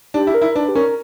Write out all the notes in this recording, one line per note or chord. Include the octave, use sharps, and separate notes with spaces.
D4 G4
E4
A#4
E4
D4 B4
G4
C#4 A#4